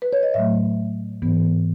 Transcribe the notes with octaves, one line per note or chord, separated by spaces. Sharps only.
B4
C#5
D#5
A2 F#3 A3 E5
G#2 E3 B3